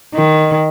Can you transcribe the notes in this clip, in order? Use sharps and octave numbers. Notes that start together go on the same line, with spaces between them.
D#3 D#5